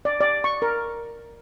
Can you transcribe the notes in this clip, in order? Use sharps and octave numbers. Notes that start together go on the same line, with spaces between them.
D5
D5
C#6
A#4